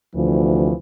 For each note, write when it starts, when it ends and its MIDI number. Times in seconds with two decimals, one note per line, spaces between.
0.15 0.72 38
0.15 0.74 48
0.15 0.74 52
0.15 0.74 53